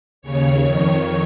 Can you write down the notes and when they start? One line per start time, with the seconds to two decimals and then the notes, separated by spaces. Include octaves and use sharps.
0.22 D#2 C#3 C#5
0.60 F2 D#3 C#5